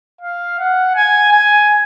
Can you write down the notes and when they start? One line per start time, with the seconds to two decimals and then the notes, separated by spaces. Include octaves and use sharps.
0.21 F5
0.59 F#5
0.95 G#5
1.31 G#5